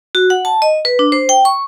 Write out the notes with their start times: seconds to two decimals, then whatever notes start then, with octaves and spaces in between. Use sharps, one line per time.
0.15 F#4
0.30 F#5
0.45 A5
0.62 D#5
0.85 B4
0.99 D4
1.12 C5
1.29 G5
1.45 C#6